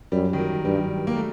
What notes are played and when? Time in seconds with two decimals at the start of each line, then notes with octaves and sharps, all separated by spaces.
0.12 F#2 G3
0.33 D#3
0.38 F#3
0.64 G2 G3
1.07 A#3
1.16 A3